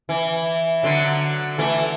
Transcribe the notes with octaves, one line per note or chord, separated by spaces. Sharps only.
E3
D3 F#3
E3 A3